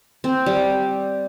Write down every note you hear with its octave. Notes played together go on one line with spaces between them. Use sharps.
C4
G3